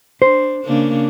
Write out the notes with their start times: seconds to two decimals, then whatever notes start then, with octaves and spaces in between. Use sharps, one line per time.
0.22 D4 C5
0.64 C#3 A#3 D4